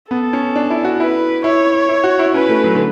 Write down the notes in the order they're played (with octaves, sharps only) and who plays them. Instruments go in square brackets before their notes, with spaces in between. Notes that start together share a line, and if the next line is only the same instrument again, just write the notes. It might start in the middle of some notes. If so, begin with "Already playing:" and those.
[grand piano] B3 [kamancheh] A4
[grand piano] C#4
D4
E4
F#4
[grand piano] E4 [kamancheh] B4
[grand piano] E4 [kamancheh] C#5
[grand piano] E4
F#4
E4
[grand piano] C#4 [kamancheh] B4
[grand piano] A3
F#3
D3